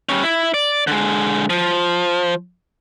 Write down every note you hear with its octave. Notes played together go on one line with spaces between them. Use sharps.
G3 C#4
E4
D5
D3 G#3
F3